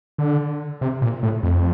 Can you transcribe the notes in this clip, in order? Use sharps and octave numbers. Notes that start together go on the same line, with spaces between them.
D3
C3
A#2
A2
F2